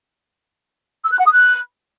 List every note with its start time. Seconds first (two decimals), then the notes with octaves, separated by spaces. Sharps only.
1.04 E6
1.11 F#6
1.18 F#5
1.25 D#6
1.31 F#6